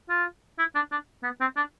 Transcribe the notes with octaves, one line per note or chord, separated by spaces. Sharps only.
F4
E4
D4
D4
B3
C4
D4